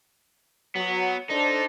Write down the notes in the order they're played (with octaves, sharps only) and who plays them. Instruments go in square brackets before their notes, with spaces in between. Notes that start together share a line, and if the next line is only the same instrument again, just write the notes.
[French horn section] F#3 [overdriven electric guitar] B3
[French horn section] D4 A4 C5 [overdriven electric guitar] D#4